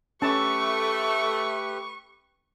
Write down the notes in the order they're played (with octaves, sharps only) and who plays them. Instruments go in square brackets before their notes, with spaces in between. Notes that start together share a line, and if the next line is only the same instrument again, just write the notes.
[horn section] A3 [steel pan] C#4 A5 [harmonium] G4 B4 [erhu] C#6